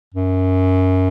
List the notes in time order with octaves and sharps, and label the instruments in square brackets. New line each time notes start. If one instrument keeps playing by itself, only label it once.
[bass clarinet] F#2